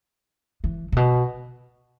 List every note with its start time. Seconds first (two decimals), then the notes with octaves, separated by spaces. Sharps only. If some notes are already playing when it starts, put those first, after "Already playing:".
0.64 E3
0.92 A#2
0.96 B2